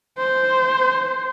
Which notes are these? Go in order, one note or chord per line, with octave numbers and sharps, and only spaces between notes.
C5